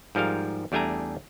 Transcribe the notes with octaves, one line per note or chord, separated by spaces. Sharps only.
G#2 F3 G3 A#4 F5
E2 G3 A3 D4 G#5 A#5